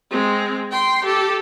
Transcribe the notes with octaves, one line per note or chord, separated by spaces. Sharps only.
G#3 C4
G5 C6
G4 A4